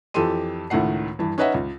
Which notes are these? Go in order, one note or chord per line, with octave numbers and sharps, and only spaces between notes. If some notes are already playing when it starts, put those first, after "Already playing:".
F2 E3 G4 A4 C6 D#7
C#2 A2 D#3 A3 F#5 C7
G2 E3
C#4 D#4 B4 D#5 E5 F#5
C#2